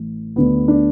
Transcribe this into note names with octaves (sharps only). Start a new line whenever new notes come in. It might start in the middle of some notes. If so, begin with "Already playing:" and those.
Already playing: A1 A2 A3
D2 D3 B3
D4